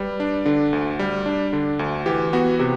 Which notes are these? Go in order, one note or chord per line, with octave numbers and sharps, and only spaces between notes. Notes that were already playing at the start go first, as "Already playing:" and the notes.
Already playing: G3 B4
D4
D3
D2
G3
D4
D3
D2
E3 G4
B3 F#4
C3 G4